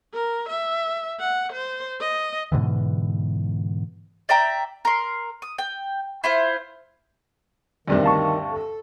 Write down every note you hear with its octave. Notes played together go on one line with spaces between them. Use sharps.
A#4
E5
F#5
C5
D#5
G#2 B2 D3 E3
D5 E5 G5 A#5
A#4 C6
D#6
G5
E4 F4 C5
D2 G2 C3 D#3
F5 A5 C#6
A4